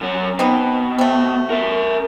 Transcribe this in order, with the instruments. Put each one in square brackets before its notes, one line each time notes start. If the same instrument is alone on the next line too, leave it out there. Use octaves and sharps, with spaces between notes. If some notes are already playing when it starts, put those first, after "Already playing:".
[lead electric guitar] F#2 C#4
[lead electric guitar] B2 [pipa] C4 D#4 B4
[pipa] A3 C4
[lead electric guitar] A#4 E5